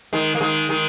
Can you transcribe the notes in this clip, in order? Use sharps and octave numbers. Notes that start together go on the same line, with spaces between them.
D#3 G#3
A#3
D#3 G#3
D#3 G#3